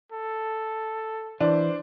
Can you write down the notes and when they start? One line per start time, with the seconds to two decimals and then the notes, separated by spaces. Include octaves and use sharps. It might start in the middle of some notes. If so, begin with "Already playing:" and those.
0.12 A4
1.41 E3 D4 C5